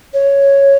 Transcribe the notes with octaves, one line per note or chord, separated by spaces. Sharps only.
C#5